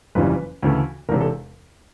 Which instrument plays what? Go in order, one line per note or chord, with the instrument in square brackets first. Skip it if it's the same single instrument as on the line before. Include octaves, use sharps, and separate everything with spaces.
[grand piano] F#1 F2 C#3 E3 G3 B4
D2 C#3 E3 A3
E1 E2 C3 A#4
A4